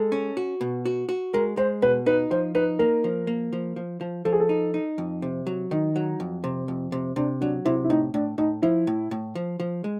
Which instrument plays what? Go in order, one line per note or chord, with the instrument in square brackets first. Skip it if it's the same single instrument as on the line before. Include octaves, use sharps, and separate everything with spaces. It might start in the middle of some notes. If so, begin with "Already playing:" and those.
Already playing: [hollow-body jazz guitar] G#3 [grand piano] A4
[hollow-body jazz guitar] C#4
F#4
B2
F#4
F#4
[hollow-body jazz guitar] G#3 [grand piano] A#4
[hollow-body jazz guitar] G#3 [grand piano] C5
[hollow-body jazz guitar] B2 [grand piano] B4
[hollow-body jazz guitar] D#4 [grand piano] B4
[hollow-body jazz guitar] F3 [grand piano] C5
[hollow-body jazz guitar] D#4 [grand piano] B4
[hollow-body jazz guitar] A#3 [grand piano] A#4
[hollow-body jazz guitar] F3
A#3
F3
F3
F3
[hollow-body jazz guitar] F3 [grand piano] A4
[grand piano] G#4
A4
[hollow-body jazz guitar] D#4
D#4
F2
C3
F#3
[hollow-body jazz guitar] D#3 [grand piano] D#4
[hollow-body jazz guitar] F#3
F2
C3
F2
C3
[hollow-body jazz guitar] C3 [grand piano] D4
[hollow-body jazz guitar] F#3 [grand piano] D4
[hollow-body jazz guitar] C3 [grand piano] E4
[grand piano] E4
[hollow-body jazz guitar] A2 [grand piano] D#4
[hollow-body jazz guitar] A2 [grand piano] D4
[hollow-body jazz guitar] A2 [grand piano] D#4
[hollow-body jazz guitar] F3 [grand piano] E4
[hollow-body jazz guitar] A2
A2
F3
F3
G#3